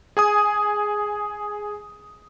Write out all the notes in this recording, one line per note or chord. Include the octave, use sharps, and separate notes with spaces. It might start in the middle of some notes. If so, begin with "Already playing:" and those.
G#4 G#5 D#6